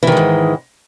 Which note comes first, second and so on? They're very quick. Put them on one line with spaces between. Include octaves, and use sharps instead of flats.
E3 D#3 G#3 G#2